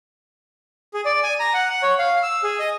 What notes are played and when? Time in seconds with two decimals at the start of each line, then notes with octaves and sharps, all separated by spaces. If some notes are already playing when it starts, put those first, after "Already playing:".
0.94 G#4
1.05 D5
1.23 G#5
1.40 A#5
1.54 F#5
1.70 F#5
1.83 C#5
1.98 F5
2.23 E6
2.43 G#4
2.59 D#5